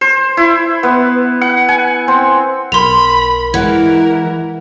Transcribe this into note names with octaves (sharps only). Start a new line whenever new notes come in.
C5
E4
B3
F#5
G#5
C4
B1 A#4 B5 C6 F7
E3 G#3 E4 A#4 F#5 G#6